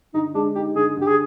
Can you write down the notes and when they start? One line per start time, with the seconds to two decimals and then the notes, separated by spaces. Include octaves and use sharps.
0.14 D3 D#4
0.34 G#3 D4
0.56 D#4 G4
0.76 D3 G#4
0.97 D3 G4
1.07 G#4